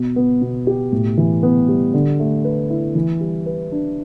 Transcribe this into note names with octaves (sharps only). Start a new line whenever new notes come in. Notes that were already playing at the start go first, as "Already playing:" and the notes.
Already playing: B2
B3
B2
G4
A2
E3
B3
G3
D3
A3
B4
E4
E3
G3
B4
D4